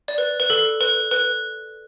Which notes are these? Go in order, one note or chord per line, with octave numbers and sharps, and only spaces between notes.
D5
B4
B4
A4
B4
B4